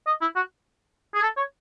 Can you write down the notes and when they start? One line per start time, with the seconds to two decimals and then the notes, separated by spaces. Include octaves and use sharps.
0.07 D#5
0.21 E4
0.36 F#4
1.15 G#4
1.23 A4
1.37 C#5